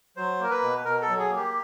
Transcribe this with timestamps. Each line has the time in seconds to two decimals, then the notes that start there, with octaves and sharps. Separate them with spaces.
0.17 F#3 C5
0.40 A#3 A#4
0.50 B4
0.62 B2
0.85 B2 A#4
1.02 A4
1.08 F#3
1.19 G#4
1.30 A#3
1.36 G4